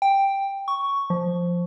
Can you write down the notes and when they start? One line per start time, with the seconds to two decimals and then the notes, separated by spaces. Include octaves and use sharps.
0.02 G5
0.68 C#6
1.10 F3